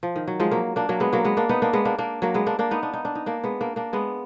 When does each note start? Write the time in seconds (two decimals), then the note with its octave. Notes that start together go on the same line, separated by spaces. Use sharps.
0.03 F3
0.16 D#3
0.28 F#3
0.40 F3 G#3
0.51 F#3 A#3
0.76 A#3 D4
0.89 F#3 A#3
1.00 G#3 B3
1.13 F#3 A#3
1.24 G#3 B3
1.37 A#3 D4
1.49 B3 D#4
1.62 A#3 D4
1.73 G#3 B3
1.85 A#3 D4
1.98 A#3 D4
2.22 F#3 A#3
2.34 G#3 B3
2.46 A#3 D4
2.59 A#3 D4
2.71 B3 D#4
2.83 D4
2.94 D#4
3.05 D4
3.15 D#4
3.26 A#3 D4
3.44 G#3 B3
3.61 A#3 D4
3.76 A#3 D4
3.93 G#3 B3